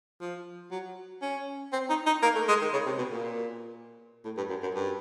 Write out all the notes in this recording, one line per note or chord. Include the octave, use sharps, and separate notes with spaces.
F3
F#3
C#4
C4
D#4
D#4
A#3
A3
G#3
D#3
C#3
C3
B2
A#2
A2
G2
F#2
F#2
G2